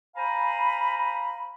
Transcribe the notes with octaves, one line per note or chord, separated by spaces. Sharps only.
C5 F5 G#5 A#5 B5